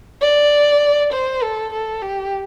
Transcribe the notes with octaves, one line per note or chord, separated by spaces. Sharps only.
D5
C5
A4
A4
G4